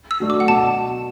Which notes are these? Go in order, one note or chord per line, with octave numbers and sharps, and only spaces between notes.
E6
F#3 A3 D4
D6
F#5
B2 A5